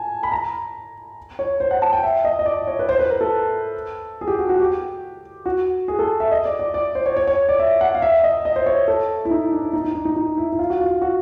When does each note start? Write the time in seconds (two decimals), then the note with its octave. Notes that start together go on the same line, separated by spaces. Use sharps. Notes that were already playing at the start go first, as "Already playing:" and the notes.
Already playing: G#5 A5
0.23 B5
0.32 A#5
1.39 C#5
1.60 C5
1.71 F#5
1.82 A5
1.93 G5
2.03 E5
2.25 D#5
2.39 D#5
2.46 D5
2.67 C#5
2.79 B4
2.89 C5
2.99 B4
3.10 A#4
3.21 A4
4.21 G#4
4.28 G4
4.39 F#4
4.49 F#4
4.60 G4
5.46 F#4
5.88 G#4
5.99 A4
6.20 E5
6.31 D#5
6.45 D5
6.59 D5
6.74 D5
6.95 C5
7.06 C#5
7.17 C#5
7.27 C#5
7.49 D5
7.60 E5
7.81 F#5
7.95 F5
8.02 E5
8.24 D#5
8.45 D#5
8.56 C5
8.66 C#5
8.88 A4
9.25 E4
9.31 D#4
9.52 D4
9.73 D#4
9.84 D#4
9.95 D4
10.05 D#4
10.16 D#4
10.38 E4
10.52 E4
10.59 F4
10.70 F#4
10.80 F4
11.02 F#4